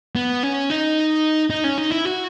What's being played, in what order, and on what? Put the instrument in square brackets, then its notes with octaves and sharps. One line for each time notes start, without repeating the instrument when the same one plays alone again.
[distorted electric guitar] B3
C#4
D#4
D#4
C#4
D#4
E4
F#4